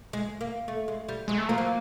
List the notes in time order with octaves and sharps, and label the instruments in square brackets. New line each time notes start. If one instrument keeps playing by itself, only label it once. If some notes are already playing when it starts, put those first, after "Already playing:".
[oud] G#3
A#3
A3
G#3
G3
[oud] F#3 [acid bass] G#3
[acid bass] A3
[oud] F3 [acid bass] A#3
[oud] F#3